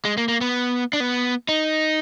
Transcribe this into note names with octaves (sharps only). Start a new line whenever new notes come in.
G#3
A#3
A#3
B3
D4
B3
D#4